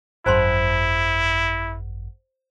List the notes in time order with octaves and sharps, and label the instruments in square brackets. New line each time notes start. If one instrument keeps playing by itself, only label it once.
[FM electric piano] G#1 F#2 [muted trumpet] E4 [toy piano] C5 A5 C6